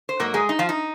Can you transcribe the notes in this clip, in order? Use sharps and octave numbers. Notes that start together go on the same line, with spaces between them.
C5
G#2 F#3 A#3 A#4
G#3 G#4
D#4
F3 F4
D#4